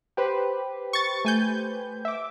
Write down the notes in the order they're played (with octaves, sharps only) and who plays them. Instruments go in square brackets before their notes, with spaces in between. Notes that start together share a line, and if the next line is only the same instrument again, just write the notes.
[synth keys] G4 B4 C5
[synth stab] C#6 A6
A3 G#5 G6
[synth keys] E5 D6